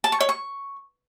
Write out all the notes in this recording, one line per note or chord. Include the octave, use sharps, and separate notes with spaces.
A5
C#6
C#5
C#6